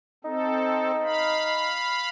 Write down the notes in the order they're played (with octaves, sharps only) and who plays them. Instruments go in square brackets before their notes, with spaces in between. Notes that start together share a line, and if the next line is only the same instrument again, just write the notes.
[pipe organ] C4 A4 [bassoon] D#4
[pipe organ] F5 B5